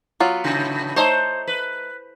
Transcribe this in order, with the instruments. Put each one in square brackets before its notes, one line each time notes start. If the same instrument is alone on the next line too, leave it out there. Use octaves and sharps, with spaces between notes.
[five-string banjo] F#3 B3 F4
[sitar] A2 C#3
[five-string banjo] A3 D#4 C#5 [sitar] C5
[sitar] B4